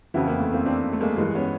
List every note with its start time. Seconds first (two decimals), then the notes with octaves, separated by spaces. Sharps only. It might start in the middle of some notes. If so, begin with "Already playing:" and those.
0.14 F2 C#3 E3 E4 F#4
0.27 A#3 C4
0.39 A3 B3
0.53 A#3 C4
0.66 C4 D4
0.93 A3
1.00 G#3 A#3
1.17 G2 E3 G#3
1.35 B3 C#4